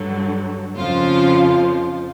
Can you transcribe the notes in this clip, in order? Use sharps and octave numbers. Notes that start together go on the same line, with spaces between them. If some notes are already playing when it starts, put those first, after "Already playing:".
Already playing: G2 D3 F#3
F2 C#3 F3 F4 F5